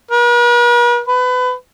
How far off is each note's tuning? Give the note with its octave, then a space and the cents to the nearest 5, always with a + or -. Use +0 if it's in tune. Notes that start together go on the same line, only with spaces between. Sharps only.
B4 -45
B4 +25